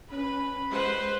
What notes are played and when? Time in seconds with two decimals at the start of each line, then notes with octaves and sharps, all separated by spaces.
0.11 C#4 B4 B5
0.71 G#3 B4 C5 F#5